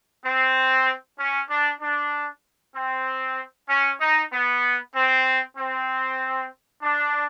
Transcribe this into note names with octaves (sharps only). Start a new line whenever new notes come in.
C4
C#4
D4
D4
C4
C#4
D#4
B3
C4
C4
D4